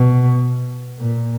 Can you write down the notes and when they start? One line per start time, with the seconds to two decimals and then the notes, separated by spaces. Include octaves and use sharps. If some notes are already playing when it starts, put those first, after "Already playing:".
Already playing: B2
0.99 A#2